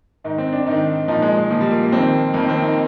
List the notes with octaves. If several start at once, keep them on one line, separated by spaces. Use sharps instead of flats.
G#2 D#3 D#4
C4
D4
G#2 D#3 D#4
A#2 F3 D#4
G#3
G#3
A#2 F3 A#3
G3
A#3
A#3
F2 D#3 C4
F2 D#3 A#3
C4
D#4